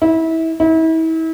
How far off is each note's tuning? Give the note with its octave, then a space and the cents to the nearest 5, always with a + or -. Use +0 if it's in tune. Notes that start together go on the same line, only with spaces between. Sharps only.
E4 -25
E4 -35